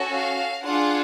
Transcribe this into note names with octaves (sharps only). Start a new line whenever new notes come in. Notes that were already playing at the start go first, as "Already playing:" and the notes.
Already playing: C#4 F#4 A4
F5
D4 F4 G#4 F#5